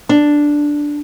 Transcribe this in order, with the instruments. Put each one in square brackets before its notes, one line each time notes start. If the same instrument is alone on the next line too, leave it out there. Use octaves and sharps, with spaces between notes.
[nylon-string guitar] D4